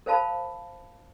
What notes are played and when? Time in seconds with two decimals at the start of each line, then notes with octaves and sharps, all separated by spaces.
0.06 A#4 C5 F5 A5 B5